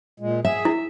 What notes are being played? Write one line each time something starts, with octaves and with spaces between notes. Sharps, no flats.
A#2 G#3
G#4 E5
E4